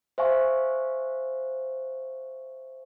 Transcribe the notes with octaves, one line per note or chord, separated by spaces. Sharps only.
C5 E5 F5 G#5 C#6